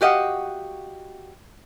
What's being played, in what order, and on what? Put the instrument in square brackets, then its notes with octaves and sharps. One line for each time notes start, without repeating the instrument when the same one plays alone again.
[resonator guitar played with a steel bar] F#4 G4 D#5 F5 F#5